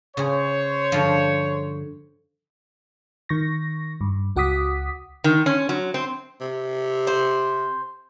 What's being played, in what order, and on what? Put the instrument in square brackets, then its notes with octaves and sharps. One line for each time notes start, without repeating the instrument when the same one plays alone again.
[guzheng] C#3 G#4 [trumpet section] C5 C#5
[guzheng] G2 D3 F3
[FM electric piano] D#3 C#6 A#6
G2
C#2 F#4 F#5 D6 D#6 B6
[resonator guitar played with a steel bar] D#3
C#4
F#3
C4
[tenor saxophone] C3
[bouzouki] C5